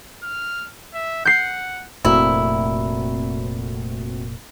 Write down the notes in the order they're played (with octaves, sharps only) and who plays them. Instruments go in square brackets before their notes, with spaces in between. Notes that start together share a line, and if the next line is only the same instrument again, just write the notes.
[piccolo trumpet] F6
E5
[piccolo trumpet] F#5 [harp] G6 C7
[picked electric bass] F1 A#2 [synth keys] A3 C4 F#4 [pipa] E4